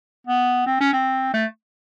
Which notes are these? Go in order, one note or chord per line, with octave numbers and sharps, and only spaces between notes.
B3
C4
C#4
C4
A3